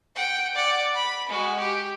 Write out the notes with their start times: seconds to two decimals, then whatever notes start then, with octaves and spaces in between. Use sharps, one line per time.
0.16 F#5 G5
0.55 D5 F#5
0.94 B5
1.29 G#3 F#4
1.59 G4